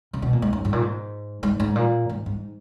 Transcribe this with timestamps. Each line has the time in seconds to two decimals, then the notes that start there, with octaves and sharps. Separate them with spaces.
0.13 C#3
0.22 B2
0.33 A#2
0.42 G#2
0.53 F#2
0.65 G#2
0.73 A#2
0.82 G#2
1.43 G#2
1.60 G#2
1.76 A#2
2.09 G#2
2.26 G#2